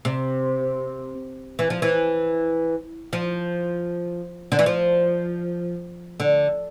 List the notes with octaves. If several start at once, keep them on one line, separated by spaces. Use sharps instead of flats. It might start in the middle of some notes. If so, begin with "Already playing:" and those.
C3
E3
F3
E3
F3
D3
E3
F3
D3